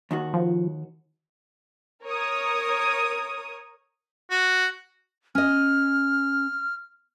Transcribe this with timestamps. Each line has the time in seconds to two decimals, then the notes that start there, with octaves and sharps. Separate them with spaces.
0.11 D#2 D#3 F#4
0.34 F3
2.03 A#4 C#5 D#6
4.31 F#4
5.35 C#4 D#5 F6